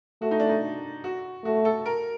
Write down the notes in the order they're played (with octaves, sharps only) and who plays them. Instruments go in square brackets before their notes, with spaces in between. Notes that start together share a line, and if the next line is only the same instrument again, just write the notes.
[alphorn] A3 [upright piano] F#4
[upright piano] D#4
D4
D#4
F#4
[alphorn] A3 [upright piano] F#4
[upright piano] A4
A#4